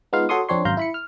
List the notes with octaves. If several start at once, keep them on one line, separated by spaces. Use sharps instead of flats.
G#3 B3 D#4 F4 F5
F#4 A4 C#5 C6 C#6 D#6
F2 C4 D4 C#5 C6
G#1 F#2 F5 A#5 C6 G6
E4 B5 C#7
F6